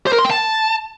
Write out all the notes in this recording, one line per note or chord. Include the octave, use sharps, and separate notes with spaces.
C5
A#4
C6
G5
A5